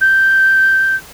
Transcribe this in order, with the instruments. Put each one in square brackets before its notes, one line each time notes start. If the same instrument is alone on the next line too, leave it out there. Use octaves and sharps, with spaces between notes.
[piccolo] G6